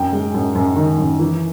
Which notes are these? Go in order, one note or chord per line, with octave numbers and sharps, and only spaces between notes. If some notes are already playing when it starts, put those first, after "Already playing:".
Already playing: F#2 G5
G#3
F#2
F#2
D#3
F#2
E3